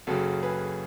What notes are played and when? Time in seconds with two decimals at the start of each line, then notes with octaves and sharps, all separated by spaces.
0.07 F#1 F#2 C#3 F#4 A4
0.43 G#4 B4